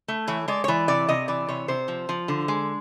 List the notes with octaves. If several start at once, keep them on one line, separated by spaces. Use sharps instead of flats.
A3
E3 C#5
G#3 D5
C#5
E3 D5
C3 D5
C3 D#5
E3 D5
C3 C#5
C3 C5
F3
F3
D3
G#3